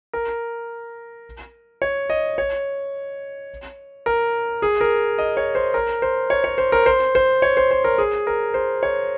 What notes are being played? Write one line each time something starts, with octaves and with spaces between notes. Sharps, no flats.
A#4
C#5
D#5
C#5
A#4
G#4
A#4
D#5
C#5
C5
A#4
C5
C#5
C#5
C5
A#4
C5
C5
C#5
C5
C5
A#4
G#4
A#4
C5
C#5